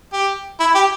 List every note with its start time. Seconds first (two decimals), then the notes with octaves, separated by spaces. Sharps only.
0.13 G4
0.60 E4
0.75 G4